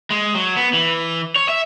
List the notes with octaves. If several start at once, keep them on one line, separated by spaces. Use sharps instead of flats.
G#3
F#3
B3
E3
C#5
E5